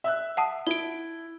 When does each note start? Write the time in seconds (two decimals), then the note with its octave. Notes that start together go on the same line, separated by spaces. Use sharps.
0.04 E5 E6 F#6
0.37 F#5 A5 D#6
0.67 E4 D7 G7